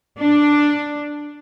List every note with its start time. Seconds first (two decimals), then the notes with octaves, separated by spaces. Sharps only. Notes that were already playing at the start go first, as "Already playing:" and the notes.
0.20 D4